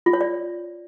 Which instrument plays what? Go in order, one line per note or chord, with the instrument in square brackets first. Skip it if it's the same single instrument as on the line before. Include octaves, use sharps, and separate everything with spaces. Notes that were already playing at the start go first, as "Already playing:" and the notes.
[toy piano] F4
C#5
D5